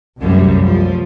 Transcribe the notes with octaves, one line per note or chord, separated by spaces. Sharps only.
C2 F#2 A2 E3 G3
F3